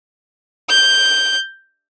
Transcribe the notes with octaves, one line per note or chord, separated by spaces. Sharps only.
G6